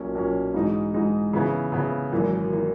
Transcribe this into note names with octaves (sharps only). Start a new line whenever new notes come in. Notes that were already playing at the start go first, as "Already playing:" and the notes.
Already playing: B1 A#2 A#3 C#4
B1 A#2 A#3 C#4
G#2 E3 G#3 D#4
G#2 E3 G#3 D#4
C#3 E3 B3 E4
C#3 E3 B3 E4
G#1 F#2 E3 A#3
E3 A#3